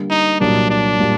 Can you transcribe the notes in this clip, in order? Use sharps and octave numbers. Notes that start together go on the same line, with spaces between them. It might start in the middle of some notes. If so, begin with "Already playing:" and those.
Already playing: D3 G3 A#3
D#4
C2 A#2 F#3 A#3 D4 F#4
D4
A#2 G3 A#3